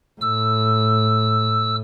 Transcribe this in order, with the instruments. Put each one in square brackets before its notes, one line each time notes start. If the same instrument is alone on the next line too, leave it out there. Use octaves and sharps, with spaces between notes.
[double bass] A2 [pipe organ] E6